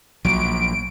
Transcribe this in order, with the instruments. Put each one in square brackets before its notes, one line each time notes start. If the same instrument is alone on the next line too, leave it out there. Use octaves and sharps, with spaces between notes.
[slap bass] A#1 F#3 [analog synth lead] D7